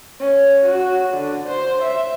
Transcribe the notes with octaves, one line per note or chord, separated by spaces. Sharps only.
C#4
F#4
D3
C5
E5